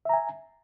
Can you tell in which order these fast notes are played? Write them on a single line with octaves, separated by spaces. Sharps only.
E5 A#5 G#5